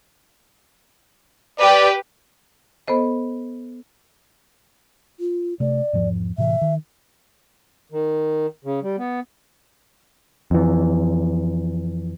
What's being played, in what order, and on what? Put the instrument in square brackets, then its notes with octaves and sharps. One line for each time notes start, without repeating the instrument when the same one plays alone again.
[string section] G4 B4 [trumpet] D5
[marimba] B3 A4 C5 D#5
[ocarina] F4
[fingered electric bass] C3 A3 [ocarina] D5
[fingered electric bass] E2 G#2 F3
[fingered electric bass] A2 C3 E3 [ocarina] E5
[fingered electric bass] D#3
[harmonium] D#3
C#3
G3
B3
[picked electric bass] F2 E3